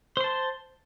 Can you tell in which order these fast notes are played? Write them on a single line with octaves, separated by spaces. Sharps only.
C5 C6 A5